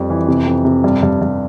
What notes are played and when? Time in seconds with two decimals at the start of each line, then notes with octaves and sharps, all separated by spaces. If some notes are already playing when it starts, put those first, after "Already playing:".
Already playing: F2 G3
0.10 E3
0.28 C3
0.46 F2
0.65 C3
0.84 G2
1.03 G2
1.22 G2